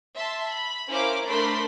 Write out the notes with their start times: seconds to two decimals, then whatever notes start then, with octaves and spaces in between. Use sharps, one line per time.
0.16 E5 A5 C6
0.47 B5
0.89 C#4 E4 A#4 C5 F5 D6
1.26 A3 D4 A#4 C5 B5 C6